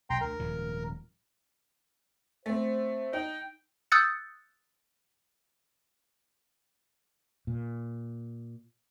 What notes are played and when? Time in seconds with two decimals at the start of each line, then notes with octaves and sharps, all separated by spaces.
0.10 B1 G5 A#5 C6
0.21 D2 A#4
0.40 D#1 G#2 F3
2.46 A3 C4 C5
3.13 D#4 G5
3.92 D#6 E6 F#6 G6 A6 C#7
7.47 A#2